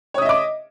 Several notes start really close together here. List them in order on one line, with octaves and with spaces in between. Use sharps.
C#5 D#6 E5 D#5 D6